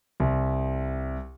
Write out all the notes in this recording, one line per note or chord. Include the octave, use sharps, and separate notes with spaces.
C2